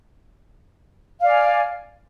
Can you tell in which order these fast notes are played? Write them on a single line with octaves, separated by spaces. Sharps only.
F5 D5 G#5